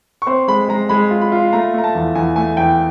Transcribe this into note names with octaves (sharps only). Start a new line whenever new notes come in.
C#6
C4 C6
G#3 B5
G#3 A#5
G#3 B5
F4
B5
F4
A3 A#5
A3 A#5
A5
E2
E2 G#5
A3 G#5
E2 G5